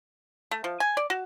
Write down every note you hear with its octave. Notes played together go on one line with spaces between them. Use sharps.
A3
F3
G#5
D5
F#4